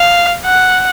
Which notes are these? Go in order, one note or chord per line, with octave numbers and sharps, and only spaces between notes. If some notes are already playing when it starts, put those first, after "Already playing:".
Already playing: F5
F#5